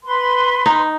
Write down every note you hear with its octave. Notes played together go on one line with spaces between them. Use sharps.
B4 C6
D#4